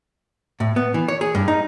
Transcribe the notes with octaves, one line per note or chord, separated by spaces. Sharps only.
A2
B3
E3
C#5
G#4
G2
D#4